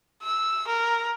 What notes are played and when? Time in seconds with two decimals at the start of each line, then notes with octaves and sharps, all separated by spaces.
0.22 E6
0.67 A#4